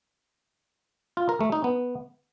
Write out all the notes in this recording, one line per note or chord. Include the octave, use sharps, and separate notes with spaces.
F4
A#4
A3
D#4
B3